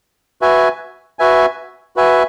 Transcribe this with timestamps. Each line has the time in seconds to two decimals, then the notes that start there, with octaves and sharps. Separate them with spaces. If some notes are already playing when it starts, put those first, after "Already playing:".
0.41 F#4 B4 E5 G#5
1.19 F#4 B4 E5 G#5
1.96 F#4 B4 E5 G#5